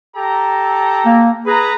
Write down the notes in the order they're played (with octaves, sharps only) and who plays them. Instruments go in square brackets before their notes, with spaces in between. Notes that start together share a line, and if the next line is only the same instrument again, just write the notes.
[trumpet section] G4 A4 A#5
[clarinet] A#3
[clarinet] G#4 [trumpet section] B4 A#5